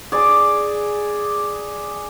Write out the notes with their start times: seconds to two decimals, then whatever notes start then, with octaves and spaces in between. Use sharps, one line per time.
0.12 G#4 D5